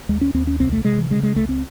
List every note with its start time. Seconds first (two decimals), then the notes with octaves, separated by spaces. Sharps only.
0.09 D#2 G#3
0.21 C#4
0.34 D#2 C4
0.47 C#4
0.60 C2 C4
0.72 A3
0.85 C3 G#3
0.98 E3
1.10 C#3 G#3
1.23 G#3
1.36 C#2 A3
1.49 C4